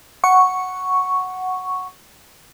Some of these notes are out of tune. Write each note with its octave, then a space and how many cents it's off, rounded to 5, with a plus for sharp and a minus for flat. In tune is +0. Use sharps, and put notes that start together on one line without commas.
F#5 +0 C#6 +0